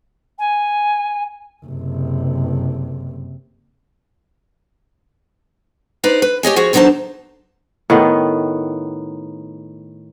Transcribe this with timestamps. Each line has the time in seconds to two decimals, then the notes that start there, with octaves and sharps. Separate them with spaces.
0.38 G#5
1.65 F#1 C3
6.04 D#4 B4 C5 D5
6.22 B4
6.43 G4 C#5 D#5 G#5
6.56 F3 F#4 G#4 C#5
6.73 E2 D3 F#3 D#4 C5 A5
7.90 A2 D#3 B3